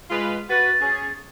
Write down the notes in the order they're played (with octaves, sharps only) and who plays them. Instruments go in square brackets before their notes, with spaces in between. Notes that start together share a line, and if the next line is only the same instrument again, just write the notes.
[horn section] G#3 F4 B4
[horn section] F#4 B4 [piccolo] A6
[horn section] C#4 G#4